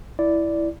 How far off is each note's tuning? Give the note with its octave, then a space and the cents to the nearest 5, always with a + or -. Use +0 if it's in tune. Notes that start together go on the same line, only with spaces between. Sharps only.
E4 +0 D5 -5